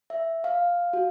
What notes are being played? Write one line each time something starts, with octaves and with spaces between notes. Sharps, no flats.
E5
F5
F#4